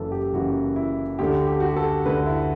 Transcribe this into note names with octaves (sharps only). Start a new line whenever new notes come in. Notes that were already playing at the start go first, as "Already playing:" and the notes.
Already playing: F#1 F#2 C#3 E3 A4 B4
G4
F#1 F#2 C#3 E3 F#4
E4
D2 D3 A3 G4
G4
F#4
G4
A4
D2 D3 A3 B4
E4